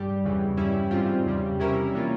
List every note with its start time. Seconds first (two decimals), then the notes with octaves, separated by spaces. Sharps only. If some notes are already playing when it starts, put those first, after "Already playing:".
Already playing: G2 G3 G4
0.24 E2 C#3 E3 G3
0.57 G2 G3 C#4 E4
0.91 G#2 G3 C4 F4
1.26 E2 C#3 G3
1.59 C3 G3 C#4 E4 A#4
1.94 E3 A#3 C#4 F4